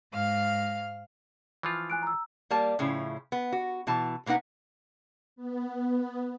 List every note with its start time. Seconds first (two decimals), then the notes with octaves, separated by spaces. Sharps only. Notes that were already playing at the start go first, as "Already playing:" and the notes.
0.13 G#2 F5 F6
1.63 E3 F3 F4
1.90 G#5 F#6 D7
2.03 A#5 E6
2.50 G3 A#3 A5
2.79 A2 C#3 F3 E4
3.32 B3
3.52 F#4
3.87 B2 E3 A5
4.26 B2 A#3 B3 D#4 F#5
5.36 B3